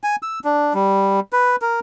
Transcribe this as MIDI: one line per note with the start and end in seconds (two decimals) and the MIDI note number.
0.04 0.16 80
0.23 0.39 88
0.44 0.73 62
0.74 1.20 55
1.33 1.56 71
1.62 1.80 70